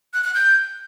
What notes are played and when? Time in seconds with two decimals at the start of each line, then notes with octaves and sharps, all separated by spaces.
0.14 F#6
0.24 F#6
0.35 G6